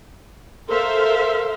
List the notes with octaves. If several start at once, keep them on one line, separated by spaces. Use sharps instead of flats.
A4 A#4 C5 E5 F5